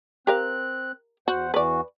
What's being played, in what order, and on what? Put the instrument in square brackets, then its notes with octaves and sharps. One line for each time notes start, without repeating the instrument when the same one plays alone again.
[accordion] C4 F#6 [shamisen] G4 A#4 F5
[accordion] E2 C5 F#5 [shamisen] F#4
[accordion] E2 E3 F#4 [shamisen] B4 D5